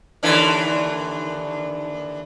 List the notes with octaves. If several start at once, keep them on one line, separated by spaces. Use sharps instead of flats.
D#2 D3 E3